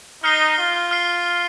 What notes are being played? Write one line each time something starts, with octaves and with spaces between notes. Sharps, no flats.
D#4 F6 C7 G7
F4
F6 C7 G7